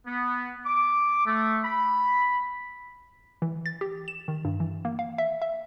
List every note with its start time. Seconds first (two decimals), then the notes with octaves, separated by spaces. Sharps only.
0.07 B3
0.66 D6
1.26 A3
1.64 B5
3.42 E3
3.66 A6
3.81 G4
4.08 E7
4.28 D#3
4.45 G2
4.60 E3
4.85 A#3
4.99 F5
5.18 E5
5.42 E5